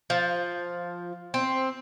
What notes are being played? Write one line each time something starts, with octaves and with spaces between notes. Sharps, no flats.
F3
C4